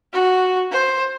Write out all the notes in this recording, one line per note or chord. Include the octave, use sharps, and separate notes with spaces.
F#4
C5